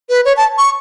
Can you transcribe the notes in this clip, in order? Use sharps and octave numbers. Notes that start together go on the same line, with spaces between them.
B4
C#5
A5
C#6